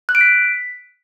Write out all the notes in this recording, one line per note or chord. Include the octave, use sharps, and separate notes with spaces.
F#6
D7
B6